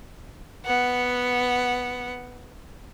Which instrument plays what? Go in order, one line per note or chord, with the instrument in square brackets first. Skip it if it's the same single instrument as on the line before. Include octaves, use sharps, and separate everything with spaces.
[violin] B3 F#5